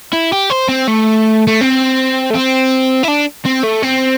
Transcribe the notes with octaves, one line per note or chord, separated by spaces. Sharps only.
E4
G4
C5
C4
A3
A3
C4
A3
C4
E4
D4
C4
A3
C4